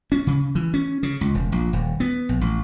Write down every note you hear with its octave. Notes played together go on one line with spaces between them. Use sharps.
C#4
C#3
E3
C#4
C#3
C#2
E1
A#1
D#1
B3
A#1
A1